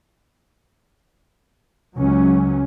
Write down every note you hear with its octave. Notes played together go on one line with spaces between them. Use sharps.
C#2 F#3 C#4